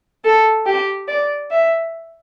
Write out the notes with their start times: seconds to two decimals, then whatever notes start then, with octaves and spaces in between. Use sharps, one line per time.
0.24 A4
0.66 G4
1.08 D5
1.51 E5